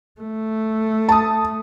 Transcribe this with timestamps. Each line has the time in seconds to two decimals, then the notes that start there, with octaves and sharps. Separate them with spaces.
0.21 A3
1.09 A5 D#6